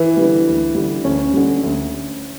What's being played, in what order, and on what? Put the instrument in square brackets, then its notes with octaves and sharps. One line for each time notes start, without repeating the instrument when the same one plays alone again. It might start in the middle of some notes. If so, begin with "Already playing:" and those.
Already playing: [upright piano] E3
[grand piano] D3 G3
D2
D3 G3
[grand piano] D2 [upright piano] C#4
[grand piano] D3 G3
D2